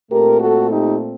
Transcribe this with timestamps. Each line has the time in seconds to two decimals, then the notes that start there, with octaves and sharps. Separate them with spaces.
0.11 A#2 A3 C4 G4 A#4
0.40 F#4 A4
0.70 D#4 G4